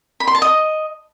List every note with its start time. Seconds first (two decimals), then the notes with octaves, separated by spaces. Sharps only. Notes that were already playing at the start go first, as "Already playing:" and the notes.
0.20 B5
0.27 C6
0.35 A5
0.42 D#5